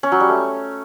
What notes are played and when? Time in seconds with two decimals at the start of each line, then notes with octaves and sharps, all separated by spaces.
0.03 C#4
0.12 F#3
0.20 G3
0.29 A3